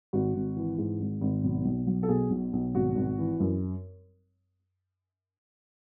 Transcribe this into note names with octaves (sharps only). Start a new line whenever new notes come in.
G#1 F#4
G#1
E3
G#2
G#1
G#1
B1
B1
F#3
A4
B2 G#4
B1
B1
G#1 F#4
G#1
E3
F#2